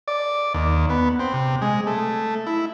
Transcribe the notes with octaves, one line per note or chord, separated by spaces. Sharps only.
D5
D#2
B3
C4
C3
G#3
A3
E4